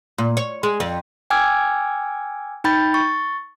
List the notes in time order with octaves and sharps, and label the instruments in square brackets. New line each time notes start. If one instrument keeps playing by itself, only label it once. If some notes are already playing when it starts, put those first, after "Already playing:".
[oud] A#2
C#5
G#3
F2
[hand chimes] G5 G#5 D6 E6 F6 G#6
D#4 G5 B5 G6 A6
C#6 A6